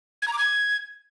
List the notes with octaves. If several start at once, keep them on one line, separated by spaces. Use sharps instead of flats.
G#6
A#5
D6
G#6